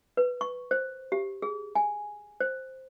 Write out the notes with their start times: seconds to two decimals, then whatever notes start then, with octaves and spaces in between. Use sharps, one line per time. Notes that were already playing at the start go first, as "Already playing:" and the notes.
0.17 B4
0.41 C#6
0.71 C5
1.12 G4
1.42 G#4
1.75 G#5
2.40 C5